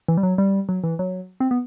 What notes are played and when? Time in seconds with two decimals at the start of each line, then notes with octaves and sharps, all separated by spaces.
0.08 E3
0.17 G3
0.23 F#3
0.38 G3
0.69 F#3
0.84 E3
0.99 F#3
1.40 C4
1.51 B3